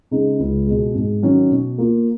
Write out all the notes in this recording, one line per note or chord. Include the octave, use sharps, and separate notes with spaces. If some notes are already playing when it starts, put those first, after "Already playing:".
C#3 G#3 D#4
C#2
B2 G#3
G#2
D#3 F#3 C#4
B2
A#3 F4